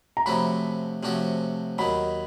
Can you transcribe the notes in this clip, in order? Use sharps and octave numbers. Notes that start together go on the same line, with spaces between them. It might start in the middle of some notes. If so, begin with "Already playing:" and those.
A#5
C3 F3 A3 C#4 F#4 B5
C3 F3 A3 C#4 F#4
D#2 D#3 F#3 B5